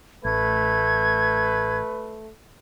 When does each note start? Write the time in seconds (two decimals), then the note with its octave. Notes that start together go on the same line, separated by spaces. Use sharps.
0.25 A1 A3 B4 G#6